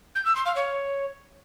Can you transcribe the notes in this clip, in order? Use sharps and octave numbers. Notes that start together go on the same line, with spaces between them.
G6
E6
C6
F5
C#5